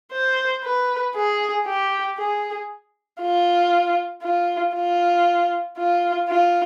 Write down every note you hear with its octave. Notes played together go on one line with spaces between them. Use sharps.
C5
B4
G#4
G4
G#4
F4
F4
F4
F4
F4